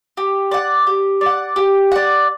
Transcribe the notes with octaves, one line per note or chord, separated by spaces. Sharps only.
G4
D5 F#5
G4
D5
F#5
G4
D5 F#5